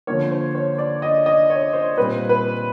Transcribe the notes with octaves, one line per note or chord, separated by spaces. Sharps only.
D3 F3 A#3 C#5
C5
C#5
D5
D#5
D#5
C#5
C5
A#2 G3 C4 B4
B4